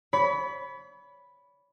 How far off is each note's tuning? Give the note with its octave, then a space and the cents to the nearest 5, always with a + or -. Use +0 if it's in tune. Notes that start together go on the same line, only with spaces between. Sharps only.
C#5 +45 B5 +0